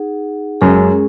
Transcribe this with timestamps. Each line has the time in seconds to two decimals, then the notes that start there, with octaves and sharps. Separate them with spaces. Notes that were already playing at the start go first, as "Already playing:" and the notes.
Already playing: D#4 G#4 F#5
0.61 F#2 G#3 C#4 G#4